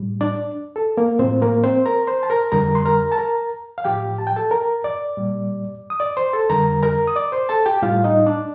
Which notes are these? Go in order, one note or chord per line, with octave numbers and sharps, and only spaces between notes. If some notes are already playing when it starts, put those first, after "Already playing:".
Already playing: A2 G3
D4 D5
A4
A#3 A#4
A2 F3 C4 C5
A#3 A#4
C4 C5
A#4 A#5
C5 C6
A5
A#4 A#5
F2 D3 G3 A#4 A#5
C6
A#4 A#5
A5
A#4 A#5
F5
A2 F3 G4 G5
A5
G5
A4 A5
A#4 A#5
D5 D6
A#2 G3
D#6
D5 D6
C5 C6
A4 A5
F2 D3 G3 A#4 A#5
A#4 A#5
D#6
D5 D6
C5 C6
A4 A5
G4 G5
A2 G3 F4 F5
D#4 D#5
D4 D5